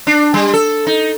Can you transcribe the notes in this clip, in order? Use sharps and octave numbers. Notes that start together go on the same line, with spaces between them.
D4
G3
A4
D#4